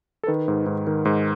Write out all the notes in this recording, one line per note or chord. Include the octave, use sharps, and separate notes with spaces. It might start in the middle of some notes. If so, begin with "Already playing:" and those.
A4
D#3 B4
G#2
G#2
D#3
G#2